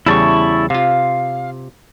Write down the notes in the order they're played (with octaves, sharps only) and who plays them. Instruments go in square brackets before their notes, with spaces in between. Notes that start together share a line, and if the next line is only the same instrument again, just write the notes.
[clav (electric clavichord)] E2 C#3 G3 [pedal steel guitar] E4 A5 C#6
[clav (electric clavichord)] C3 F4 [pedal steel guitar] F5